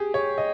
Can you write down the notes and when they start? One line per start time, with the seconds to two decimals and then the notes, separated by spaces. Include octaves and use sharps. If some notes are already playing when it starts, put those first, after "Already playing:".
Already playing: G4 G#4
0.14 C#5
0.38 D#5